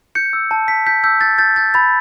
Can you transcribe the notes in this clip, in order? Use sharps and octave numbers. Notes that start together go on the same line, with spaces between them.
G6 C#7
E6
A5
A5 B6
G6 B6
E6 G6
G6 A6
G6 A6
G6 A6
B5 A6